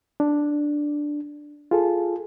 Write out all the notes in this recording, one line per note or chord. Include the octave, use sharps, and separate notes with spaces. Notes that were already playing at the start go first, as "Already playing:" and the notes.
D4
F4 G#4 A4